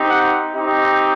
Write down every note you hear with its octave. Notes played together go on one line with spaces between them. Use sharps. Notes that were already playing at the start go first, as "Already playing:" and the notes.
Already playing: C4 D#4 G4
F#5
C4 D#4 G4